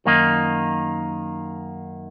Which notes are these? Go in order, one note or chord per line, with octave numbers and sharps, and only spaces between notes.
F#2 D#3 A#3 D#4